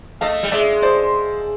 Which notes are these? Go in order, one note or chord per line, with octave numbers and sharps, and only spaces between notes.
A3 D#5 F5
G3
G#3 D5 E5
C5 D5